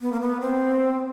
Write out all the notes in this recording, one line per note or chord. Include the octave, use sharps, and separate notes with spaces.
B3
A#3
B3
C4